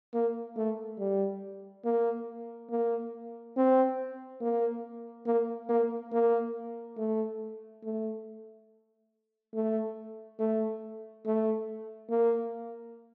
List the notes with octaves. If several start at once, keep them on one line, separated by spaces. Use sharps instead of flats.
A#3
A3
G3
A#3
A#3
C4
A#3
A#3
A#3
A#3
A3
A3
A3
A3
A3
A#3